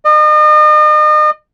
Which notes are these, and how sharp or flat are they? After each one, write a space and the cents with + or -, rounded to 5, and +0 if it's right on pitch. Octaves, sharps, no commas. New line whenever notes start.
D#5 -40